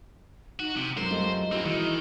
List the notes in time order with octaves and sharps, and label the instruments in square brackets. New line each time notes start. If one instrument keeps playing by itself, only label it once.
[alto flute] D#4 [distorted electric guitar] F#4
[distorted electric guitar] C3 [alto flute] C4
[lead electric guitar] F#2 A#4 [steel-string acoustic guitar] G#3 [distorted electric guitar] C5
[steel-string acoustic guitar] G3 A3 F4 [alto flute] D#5
[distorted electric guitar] A#3 C4 [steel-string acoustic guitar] E4 F#4 G#4
[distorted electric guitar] D#3 [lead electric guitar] E3